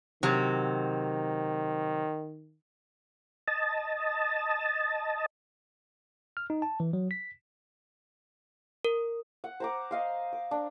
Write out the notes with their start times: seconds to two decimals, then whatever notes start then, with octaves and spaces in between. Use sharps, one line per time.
0.23 C3 D#3 F#3
3.48 D#5 A5
6.37 F6
6.50 D#4
6.62 A5
6.80 E3
6.93 F#3
7.11 B6
8.85 A#4
9.44 F#5
9.60 C5 A#5 D6
9.91 D#5 F5 C6
10.33 D6
10.51 D4